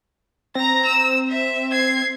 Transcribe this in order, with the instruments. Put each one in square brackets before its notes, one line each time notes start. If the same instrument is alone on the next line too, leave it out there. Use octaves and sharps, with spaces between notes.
[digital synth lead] C4 [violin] A#5 A#6
[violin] E6
E5
G#6 C7